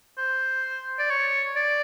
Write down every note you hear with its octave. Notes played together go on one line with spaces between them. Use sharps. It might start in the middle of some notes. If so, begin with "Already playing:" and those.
C5
D5
C#5
D5